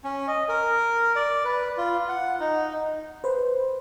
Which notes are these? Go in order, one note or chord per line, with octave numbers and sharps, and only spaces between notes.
C#4
D#5
A#4
D5
B4
F4
F#5
D#4
B4 C5